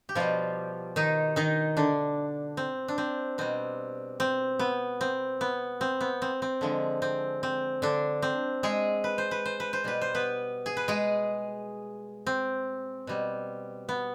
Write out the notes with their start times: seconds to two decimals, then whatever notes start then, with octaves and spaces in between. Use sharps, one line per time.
0.09 G4
0.15 B2 F3 G3 F4
0.96 D#3 D#4
1.36 D#3 D#4
1.77 D3 D4
2.57 C4
2.88 D4
2.98 C4
3.38 B2 G3 C4
4.20 C4
4.59 B3
5.01 C4
5.41 B3
5.81 C4
6.01 B3
6.22 C4
6.42 C4
6.61 D3 F3 G#3
7.02 C4
7.43 C4
7.82 D3 D4
8.22 C4
8.63 G#3 G#4
9.04 B4
9.18 C5
9.31 B4
9.45 C5
9.60 B4
9.73 C5
9.84 B2 G3 B4
10.01 C5
10.15 B3 B4
10.66 G#4
10.77 B4
10.88 G#3 G#4
12.27 C4
13.07 B2 G3
13.89 B3